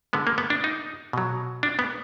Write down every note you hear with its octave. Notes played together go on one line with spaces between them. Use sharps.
D3 G#3 B3
A#3
B3
D4
D#4
B2 F#3
D4
B3